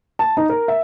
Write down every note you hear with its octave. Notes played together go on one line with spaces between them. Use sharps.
A5
D#4
A#4
E5